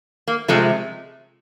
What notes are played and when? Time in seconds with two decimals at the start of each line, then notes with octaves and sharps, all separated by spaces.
0.28 A#3
0.48 C3 F3 G#3 A3